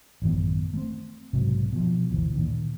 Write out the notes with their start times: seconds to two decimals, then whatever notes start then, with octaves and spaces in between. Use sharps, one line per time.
0.22 A1 F#2 D#3 B3
0.73 A3 A#3 C4
1.33 B1 G#2 C3 F#3
1.73 B2 F3
2.10 G1 D2 A#2 E3
2.35 A#2 D#3